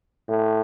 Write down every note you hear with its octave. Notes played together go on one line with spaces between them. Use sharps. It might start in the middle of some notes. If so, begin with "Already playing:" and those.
A2